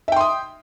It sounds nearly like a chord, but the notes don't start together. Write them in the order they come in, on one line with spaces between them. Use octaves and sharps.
E5 G5 C6 D#6